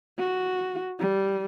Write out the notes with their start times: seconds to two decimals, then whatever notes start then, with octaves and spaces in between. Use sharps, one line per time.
0.19 F#4
1.00 G3